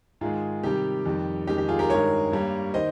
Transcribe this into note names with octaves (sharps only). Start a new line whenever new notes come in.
G#2 D#3 G#3 F4 G#4
C3 D#3 G3 G4
F2 D#3 G3
F2 D#3 G#3 G4
G4
F4 G#4
G4 A#4
G2 D#3 G#3 A#4 C#5
G2 G3 A#3
D#3 C5 D#5